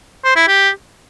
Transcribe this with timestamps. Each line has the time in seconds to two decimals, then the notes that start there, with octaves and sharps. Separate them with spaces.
0.24 C5
0.36 E4
0.48 G4